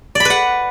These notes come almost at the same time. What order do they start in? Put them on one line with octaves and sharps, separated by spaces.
D5 B5 B4 F#5